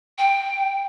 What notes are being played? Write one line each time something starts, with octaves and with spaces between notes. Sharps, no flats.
G5